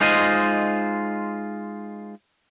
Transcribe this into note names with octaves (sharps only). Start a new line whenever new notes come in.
G#3 D#4 F4 C5 D#5